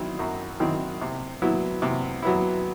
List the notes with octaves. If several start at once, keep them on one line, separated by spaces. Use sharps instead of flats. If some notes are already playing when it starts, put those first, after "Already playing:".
Already playing: D#3 F#3 C4 E4
F#2
D#3 F#3 C4 E4
C3
F#3 B3 E4
C3
F#3 B3 E4